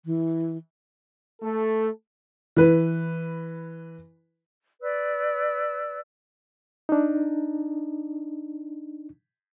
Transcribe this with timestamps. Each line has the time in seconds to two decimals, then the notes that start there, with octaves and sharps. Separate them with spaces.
0.05 E3
1.42 A3 A4
2.56 E3 B4
4.81 B4 D5 E6
6.89 D4 D#4